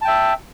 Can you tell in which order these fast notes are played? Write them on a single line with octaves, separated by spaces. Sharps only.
A5 G5 E5